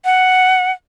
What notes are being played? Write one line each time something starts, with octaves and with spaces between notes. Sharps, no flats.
F#5